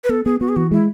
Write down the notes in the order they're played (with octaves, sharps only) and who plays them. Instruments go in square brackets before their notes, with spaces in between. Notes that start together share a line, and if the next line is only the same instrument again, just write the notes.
[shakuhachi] B4
[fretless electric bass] B3 [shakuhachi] A4
[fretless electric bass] B3 [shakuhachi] G#4
[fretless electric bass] B3 [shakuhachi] F#4
[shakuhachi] G#4
[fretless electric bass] E3 [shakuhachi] F#4
[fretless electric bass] G#3 [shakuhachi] E4